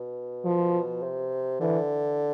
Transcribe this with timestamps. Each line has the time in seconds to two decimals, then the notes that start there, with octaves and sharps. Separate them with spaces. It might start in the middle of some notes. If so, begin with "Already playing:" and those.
Already playing: B2
0.45 F3
1.03 C3
1.60 D3 E3